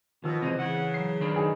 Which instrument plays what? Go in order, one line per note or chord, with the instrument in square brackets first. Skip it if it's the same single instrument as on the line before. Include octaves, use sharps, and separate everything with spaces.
[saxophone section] B2 [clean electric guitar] D#3 [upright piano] F3 E6
[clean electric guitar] C3 E3 G#3 [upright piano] C4 D#7 [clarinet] D#5
[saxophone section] C#3 [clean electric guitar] E3 [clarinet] F#5
[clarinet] F#3 [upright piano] C7
[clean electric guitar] D#3 D4 B4
[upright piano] D#4 G#4